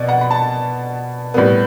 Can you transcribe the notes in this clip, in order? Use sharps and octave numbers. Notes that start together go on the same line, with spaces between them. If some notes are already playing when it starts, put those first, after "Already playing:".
Already playing: B2 D5
F#5
B5
A5
A2 G3 B3